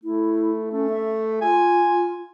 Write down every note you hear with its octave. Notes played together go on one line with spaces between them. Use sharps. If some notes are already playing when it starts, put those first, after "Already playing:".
A3 E4
A3 C#4
E5
F4 G#5